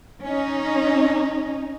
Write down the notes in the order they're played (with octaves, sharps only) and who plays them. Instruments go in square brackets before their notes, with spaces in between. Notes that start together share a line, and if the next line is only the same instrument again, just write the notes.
[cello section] C#4 D#4